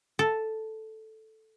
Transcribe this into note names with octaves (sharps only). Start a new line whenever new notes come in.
A4